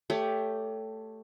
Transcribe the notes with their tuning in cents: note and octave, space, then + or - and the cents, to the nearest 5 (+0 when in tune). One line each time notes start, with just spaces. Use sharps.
A3 +5 G4 +0 C#5 +25